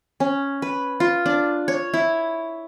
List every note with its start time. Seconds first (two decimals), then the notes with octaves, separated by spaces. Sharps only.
0.20 C#4
0.62 B4
1.00 F4
1.26 D4
1.68 C#5
1.94 E4